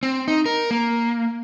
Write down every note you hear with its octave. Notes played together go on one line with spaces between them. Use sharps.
C4
D#4
A#4
A#3